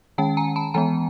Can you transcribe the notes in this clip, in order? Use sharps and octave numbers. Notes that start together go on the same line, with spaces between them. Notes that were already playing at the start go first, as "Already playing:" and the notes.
D#3 G#3 C#4 G5 A5
G#5 A#5
A5 B5
E3 G#3 B3 G#5 A#5